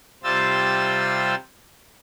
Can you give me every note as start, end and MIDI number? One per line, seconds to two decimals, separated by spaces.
0.24 1.35 48
0.24 1.35 55
0.24 1.35 65
0.24 1.35 72
0.24 1.35 88
0.24 1.35 93